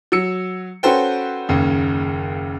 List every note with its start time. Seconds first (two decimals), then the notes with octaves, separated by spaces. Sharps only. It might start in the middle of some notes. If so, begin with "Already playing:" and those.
0.12 F#3 E6 C#7
0.83 C#4 F#4 A4 B4 C5 G5
1.49 F#1 D#2 C#3